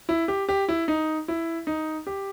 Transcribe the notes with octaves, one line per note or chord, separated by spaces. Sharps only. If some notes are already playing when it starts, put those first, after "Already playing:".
E4
G4
G4
E4
D#4
E4
D#4
G4